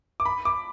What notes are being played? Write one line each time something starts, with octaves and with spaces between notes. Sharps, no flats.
D6
B5
D6